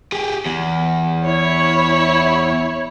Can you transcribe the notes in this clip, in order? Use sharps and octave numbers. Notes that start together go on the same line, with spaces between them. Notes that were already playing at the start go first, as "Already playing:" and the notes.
G4 G#4
E2
E4 C#5